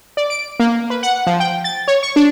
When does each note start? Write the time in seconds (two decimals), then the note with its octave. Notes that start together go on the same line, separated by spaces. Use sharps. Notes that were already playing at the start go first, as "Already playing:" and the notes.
0.17 D5
0.30 D7
0.60 A#3
0.90 B4
1.03 F#5
1.27 F3
1.40 G5
1.64 A6
1.88 C#5
2.03 C#6
2.16 D4